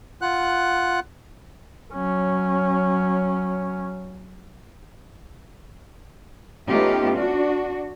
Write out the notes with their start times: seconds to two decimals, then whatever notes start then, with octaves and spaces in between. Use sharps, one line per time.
0.22 F4 F#5 F#6
1.94 F#3 C#4
6.67 A3 B3 C#4 D#4 F4 G4
7.15 D4 F#4